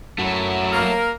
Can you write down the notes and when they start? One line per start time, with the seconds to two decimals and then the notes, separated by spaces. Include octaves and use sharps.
0.19 F#2 F#3 A3 E4 F#4
0.73 A#3 A#4